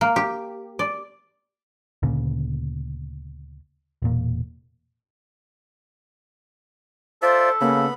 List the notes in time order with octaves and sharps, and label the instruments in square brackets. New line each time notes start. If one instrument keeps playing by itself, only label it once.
[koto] A#3
G4
D5
[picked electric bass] D2 A#2 C#3
E1 A#2
[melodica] F4 D5 E5 [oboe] A4 [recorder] C5
[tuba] C#3 [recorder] A#3 [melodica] B3 B5